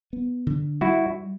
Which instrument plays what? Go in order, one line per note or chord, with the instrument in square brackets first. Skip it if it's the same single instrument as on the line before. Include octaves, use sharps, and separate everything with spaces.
[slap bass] B3
D3
[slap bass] G3 [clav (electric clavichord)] E4 F#4